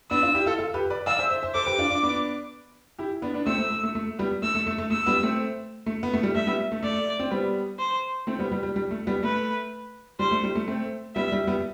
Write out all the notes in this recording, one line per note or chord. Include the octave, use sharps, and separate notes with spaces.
B3 D4 E6
D4 F4
E4 G4
F4 A4
F4 A4
G4 B4
B4 D5
D5 F5 E6
C5 E5
C5 E5
C5 E5
A4 C5 D6
G4 B4
D4 F4
D4 F4
B3 D4
E4 G4
B3 D4
B3 D4
A3 C4 E6
A3
A3
A3
A3
G3 B3
A3 E6
A3
A3
A3
A3 E6
G3 B3
A3 C4
A3
B3
A3
G3
A3 E5
G3 B3
A3
A3 D5
C4
G3 B3
C5
A3 C4
G3 B3
G3 B3
G3
G3
A3
G3 B3
A3 B4
G3 C5
A3
G3
A3
A3 C4
G3 B3 E5
G3
G3 B3